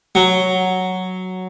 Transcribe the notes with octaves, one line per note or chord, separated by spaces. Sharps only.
F#3